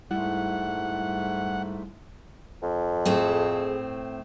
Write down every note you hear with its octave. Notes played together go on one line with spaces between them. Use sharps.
G#2 G3 A3 E4 F#5
F2
A2 A3 C4 G#4